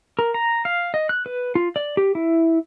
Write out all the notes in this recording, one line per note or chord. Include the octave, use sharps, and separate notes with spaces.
A#4
A#5
F5
D#5
F#6
B4
F4
D5
G4
E4